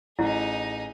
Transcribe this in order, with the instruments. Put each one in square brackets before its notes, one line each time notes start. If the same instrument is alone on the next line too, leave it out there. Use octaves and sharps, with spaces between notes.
[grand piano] A1 [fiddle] D#4 G#4 [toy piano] E4